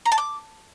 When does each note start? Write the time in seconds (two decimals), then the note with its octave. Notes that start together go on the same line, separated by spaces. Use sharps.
0.06 A#5
0.12 A5
0.18 D6